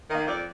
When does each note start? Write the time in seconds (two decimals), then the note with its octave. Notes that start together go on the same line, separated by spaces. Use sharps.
0.09 D#3 A#3 D#5
0.27 F2 D5